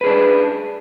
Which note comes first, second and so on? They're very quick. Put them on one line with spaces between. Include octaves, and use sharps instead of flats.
B4 G#4 D4